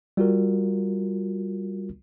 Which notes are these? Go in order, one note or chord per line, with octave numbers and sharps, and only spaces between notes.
G3 F4 F#4 A#4